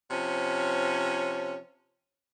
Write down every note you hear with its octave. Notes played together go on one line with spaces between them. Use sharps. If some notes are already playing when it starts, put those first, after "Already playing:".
C3 F3 C#4